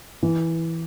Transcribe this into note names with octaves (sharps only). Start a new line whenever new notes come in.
E3